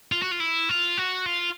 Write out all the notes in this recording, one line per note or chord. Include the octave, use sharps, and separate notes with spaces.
F4
F#4
F4
E4
F4
F#4
F4